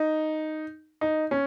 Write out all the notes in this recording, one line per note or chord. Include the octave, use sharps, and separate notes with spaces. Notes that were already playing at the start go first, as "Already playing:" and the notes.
Already playing: D#4
D#4
C#4